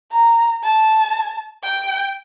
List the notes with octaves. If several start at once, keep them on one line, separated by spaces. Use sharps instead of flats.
A#5
A5
G5